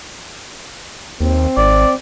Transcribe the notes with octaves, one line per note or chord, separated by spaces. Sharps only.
D#2 C4
G#1 D5